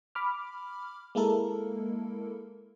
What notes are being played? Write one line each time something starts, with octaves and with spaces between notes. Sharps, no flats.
B5 D6 F6
G#3 A#3 E4 A4 A#4